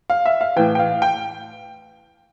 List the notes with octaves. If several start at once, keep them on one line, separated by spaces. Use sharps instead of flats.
F5
E5
F5
A2 E3 G5
G5
F5
G5